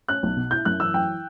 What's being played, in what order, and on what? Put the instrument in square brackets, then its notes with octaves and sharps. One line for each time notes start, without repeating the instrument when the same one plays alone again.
[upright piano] C#4 F#6
B1
B2
E4 G6
F#2 F#6
E3 E6
F#3 G5